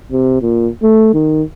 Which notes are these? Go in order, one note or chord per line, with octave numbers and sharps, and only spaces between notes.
C3
A#2
A3
D#3